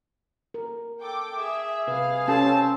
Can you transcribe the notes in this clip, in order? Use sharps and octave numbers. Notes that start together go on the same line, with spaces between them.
A#4
A4 G5 D6
G#4 E5
C3 B4 F5
C4 C#4 G4 A4 A5